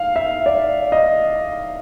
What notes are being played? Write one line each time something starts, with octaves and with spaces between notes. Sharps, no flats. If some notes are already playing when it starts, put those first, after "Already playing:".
Already playing: F5
E5
D5
D#5